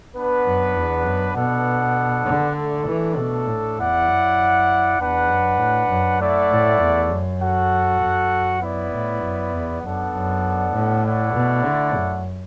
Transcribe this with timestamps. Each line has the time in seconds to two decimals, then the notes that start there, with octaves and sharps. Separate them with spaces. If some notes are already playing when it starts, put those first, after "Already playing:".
0.14 B3 D4 B4 F#5
0.45 F#2
0.75 E2
1.05 F#2
1.35 B2 B3 D4 A4 D5 F#5
2.26 D3
2.56 A3 D4 A4
2.87 E3
3.17 B2
3.47 A2
3.77 E2 E4 D5 F#5
4.07 F#2
4.98 E2 D4 B4 F#5
5.28 F#2
5.59 A2
5.89 F#2
6.19 A3 E4 D5 F#5
6.50 A2
6.80 E2
7.10 F#2
7.40 F#4 A4 F#5
8.00 F#2
8.61 B3 E4 D5
8.92 A2
9.22 F#2
9.52 E2
9.82 F#2 B3 D4 A4 D5 F#5
10.13 F#2
10.73 A2
11.04 A3 E4 D5 F#5
11.34 B2
11.64 D3
11.94 F#2